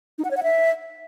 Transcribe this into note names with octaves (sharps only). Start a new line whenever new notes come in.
D#4
F#5
C#5
F#5
E5